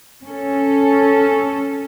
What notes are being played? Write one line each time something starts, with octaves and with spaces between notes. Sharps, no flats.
C#4 A4